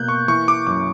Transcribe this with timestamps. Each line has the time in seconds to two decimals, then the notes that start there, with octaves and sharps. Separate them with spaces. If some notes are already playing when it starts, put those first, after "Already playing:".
Already playing: B2 A#3 F#6 G6
0.08 C#6
0.28 E3 C#6
0.48 D6
0.67 F#2 D6